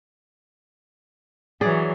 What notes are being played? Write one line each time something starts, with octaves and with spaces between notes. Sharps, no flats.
E3 F#3 G#4 C#5 D5